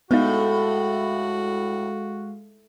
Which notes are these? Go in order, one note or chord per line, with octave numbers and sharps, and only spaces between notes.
A2 G#3 B3 D#4 F#4 F5